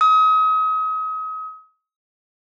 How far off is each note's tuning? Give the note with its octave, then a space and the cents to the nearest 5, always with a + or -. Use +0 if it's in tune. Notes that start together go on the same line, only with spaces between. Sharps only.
D#6 +35